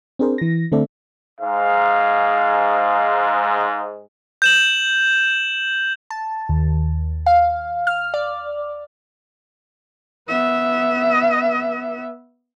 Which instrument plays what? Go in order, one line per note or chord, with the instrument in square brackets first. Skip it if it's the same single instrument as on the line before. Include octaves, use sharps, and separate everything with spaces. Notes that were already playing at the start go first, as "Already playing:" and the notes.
[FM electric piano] C4 D4 G#4 A#4 C5
E3 A#6
D3 A3 C4 A4 D5 E5
[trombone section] G#2 G#3 [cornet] F5
[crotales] G6 E7 F#7
[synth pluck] A5
D#2
F5
F6
D5
[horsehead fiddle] B3 E5